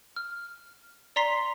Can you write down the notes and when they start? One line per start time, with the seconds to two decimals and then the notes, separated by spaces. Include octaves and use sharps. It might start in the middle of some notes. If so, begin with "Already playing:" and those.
0.16 F6
1.16 D5 A#5 C6 B6 C7